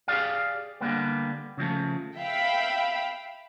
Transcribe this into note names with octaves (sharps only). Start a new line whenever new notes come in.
G4 G#4 D5 F5
D3 G3 A#3 B3
C#3 F3 A3
E5 F5 G5 B5